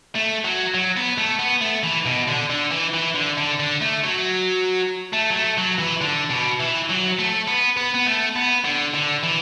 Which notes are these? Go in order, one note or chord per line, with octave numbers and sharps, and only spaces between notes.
A3
F#3
F#3
B3
A3
B3
A3
E3
B2
D3
D3
E3
E3
D3
D3
D3
A3
F#3
A3
F#3
A3
F#3
E3
D3
B2
E3
F#3
A3
B3
B3
B3
A3
B3
D3
D3
E3